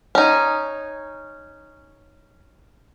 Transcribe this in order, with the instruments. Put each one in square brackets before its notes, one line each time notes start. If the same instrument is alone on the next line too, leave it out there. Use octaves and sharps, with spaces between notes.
[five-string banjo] C#4 D#4